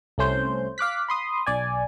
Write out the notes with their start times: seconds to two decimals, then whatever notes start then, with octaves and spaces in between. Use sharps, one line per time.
0.18 C2 A3 C#4 C5 G6
0.78 F5 D6 F#6 B6
1.08 B5 C6 D#6
1.46 B1 D5 G#5